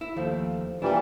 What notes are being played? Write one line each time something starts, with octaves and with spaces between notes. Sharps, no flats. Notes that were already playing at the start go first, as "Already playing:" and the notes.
E4
D#2 F3 A3
A#2 E3 G3 D4 G4